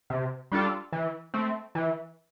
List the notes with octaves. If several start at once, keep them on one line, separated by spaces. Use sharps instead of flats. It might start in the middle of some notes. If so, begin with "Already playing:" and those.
C3
G3 D4 F4 A4
E3
A3 C4
E3